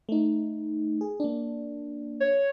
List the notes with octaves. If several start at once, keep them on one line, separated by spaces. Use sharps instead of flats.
A3 D#4
G#4
A#3 D4
C#5